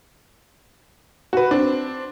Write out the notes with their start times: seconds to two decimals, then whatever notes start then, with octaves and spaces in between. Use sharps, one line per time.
1.33 F#4 B4
1.51 C4 D4